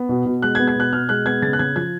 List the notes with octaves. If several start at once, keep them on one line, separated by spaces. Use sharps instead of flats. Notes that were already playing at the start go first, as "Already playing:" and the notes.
Already playing: B3
B2
B2
G#3 F#6
G#6
B3
G#6
B2 F#6
B2 F6
G#3 F#6
B3 G#6
C#3 A6
F#6
C#3 G#6
F3 G#6